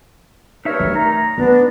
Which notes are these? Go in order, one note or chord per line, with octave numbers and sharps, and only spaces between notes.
G2 D#4 A#4 C#5 E5
A3
D#4 A#5
A3 B3 D4